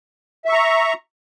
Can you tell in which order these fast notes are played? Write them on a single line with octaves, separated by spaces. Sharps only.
E5 C#6 A#5